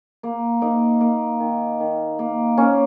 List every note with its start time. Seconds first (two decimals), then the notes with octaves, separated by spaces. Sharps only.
0.23 A#3
0.62 A#3 D#4
1.01 A#3
1.40 D#3
1.80 D#3
2.19 A#3
2.57 A#3 C#4